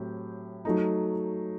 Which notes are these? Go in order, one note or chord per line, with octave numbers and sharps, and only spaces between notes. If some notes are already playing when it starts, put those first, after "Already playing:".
Already playing: A2 F#3 C4 G4
F#3 A3 D#4